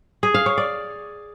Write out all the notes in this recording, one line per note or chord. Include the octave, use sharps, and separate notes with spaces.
G#4
F5
C#5
D5